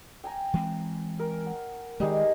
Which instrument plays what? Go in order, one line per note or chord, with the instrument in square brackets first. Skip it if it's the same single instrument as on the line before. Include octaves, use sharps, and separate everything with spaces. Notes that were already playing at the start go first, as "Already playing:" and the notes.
[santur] G5 G#5 A#5
[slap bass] E3 G#3 C4
[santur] A#4
F#5
[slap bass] D#3 G#3 [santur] G3 D#4 G#4